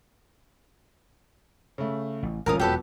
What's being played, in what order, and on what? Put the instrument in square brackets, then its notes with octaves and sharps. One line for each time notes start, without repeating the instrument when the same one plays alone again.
[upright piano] C#3 A3
[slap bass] A1
[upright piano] D#1 F3 C#4 [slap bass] G#1 G3 [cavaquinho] A#4 F5 D#6
[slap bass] E1 [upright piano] F3 F#3 B3 [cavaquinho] G4 A4 B4